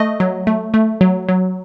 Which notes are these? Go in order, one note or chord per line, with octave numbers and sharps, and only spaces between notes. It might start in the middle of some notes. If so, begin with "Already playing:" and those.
Already playing: A3 D#5
F#3
A3
A3
F#3
F#3